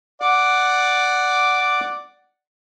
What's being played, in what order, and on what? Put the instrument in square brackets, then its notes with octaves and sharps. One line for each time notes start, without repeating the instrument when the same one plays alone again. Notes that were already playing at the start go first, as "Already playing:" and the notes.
[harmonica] D5 F#5 [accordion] D6